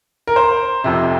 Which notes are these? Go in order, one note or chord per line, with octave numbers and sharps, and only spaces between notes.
A#4
C5
F1 F2 C3